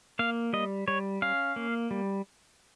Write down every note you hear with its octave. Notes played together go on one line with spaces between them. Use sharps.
A#3 F5
G3 D#5
G3 C#5
C#4 F5
A#3
G3